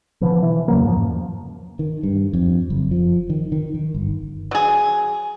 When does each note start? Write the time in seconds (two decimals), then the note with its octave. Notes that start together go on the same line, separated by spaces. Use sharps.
0.21 B2 D3 E3 F3
0.42 E3
0.68 E2 C#3 F#3 A#3
0.83 G#2 F3
1.79 D#3
2.03 G2
2.33 F2
2.70 F#1
2.91 F3
3.30 D#3
3.52 D#3
3.74 D#3
3.94 G1
4.51 F#3 G#4